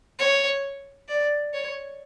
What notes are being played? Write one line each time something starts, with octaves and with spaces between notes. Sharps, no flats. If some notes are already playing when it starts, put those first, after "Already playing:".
C#5
D5
C#5